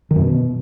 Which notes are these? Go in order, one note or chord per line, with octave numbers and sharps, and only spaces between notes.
D#3
F#2
B2